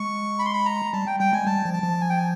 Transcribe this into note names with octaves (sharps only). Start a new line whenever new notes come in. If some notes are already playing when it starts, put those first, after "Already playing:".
Already playing: G#3 C#6
B5
C6
B5
A#5
G3 A5
G5
G3 G5
G#3 G#5
G3 A5
F3
A5
F3
G#5
G5
G#5